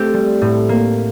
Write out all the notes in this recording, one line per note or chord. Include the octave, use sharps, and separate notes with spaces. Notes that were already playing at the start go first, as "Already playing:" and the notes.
Already playing: A3 C4 G4 A4
G3
A2
A#3